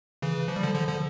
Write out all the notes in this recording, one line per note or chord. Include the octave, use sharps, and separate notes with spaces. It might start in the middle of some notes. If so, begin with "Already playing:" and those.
C#3 E3
F3
G3
D3 F3
D3 F3
D3 F3